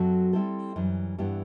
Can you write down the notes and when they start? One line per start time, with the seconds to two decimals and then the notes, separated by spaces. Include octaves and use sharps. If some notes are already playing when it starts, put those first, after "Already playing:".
Already playing: F#2 F#3 C4 F#4 A4
0.33 G3 C4 E4 A4 C5
0.76 F#2 E3 G3
1.18 G2 E3 B3 E4 G4